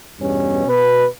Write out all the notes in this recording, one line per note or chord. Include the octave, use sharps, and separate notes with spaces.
E2 G2 B2 C#4
B2 B4